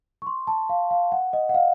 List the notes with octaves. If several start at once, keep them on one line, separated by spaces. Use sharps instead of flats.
C#6
C6
A5
F5
F5
F#5
D#5
F#5
F5